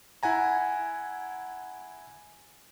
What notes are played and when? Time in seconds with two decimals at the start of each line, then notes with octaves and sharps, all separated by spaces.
0.23 E4 F#5 G#5 A#5